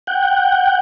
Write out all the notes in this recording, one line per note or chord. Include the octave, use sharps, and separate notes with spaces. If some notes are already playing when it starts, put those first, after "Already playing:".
F#5 G5